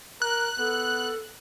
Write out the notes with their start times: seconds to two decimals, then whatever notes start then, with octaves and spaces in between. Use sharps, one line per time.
0.22 A#4 F#6
0.59 B3 A4